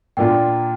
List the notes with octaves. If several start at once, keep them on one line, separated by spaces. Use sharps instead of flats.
A#2 A#3 D4 F4 G5